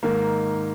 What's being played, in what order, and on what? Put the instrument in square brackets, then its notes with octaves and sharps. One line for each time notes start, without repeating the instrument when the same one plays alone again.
[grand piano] G#2 D#3 A#3